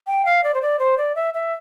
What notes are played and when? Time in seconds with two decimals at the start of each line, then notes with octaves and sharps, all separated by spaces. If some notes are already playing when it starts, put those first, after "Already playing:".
0.07 G5
0.25 F5
0.44 D5
0.54 C5
0.62 D5
0.79 C5
0.98 D5
1.16 E5
1.34 E5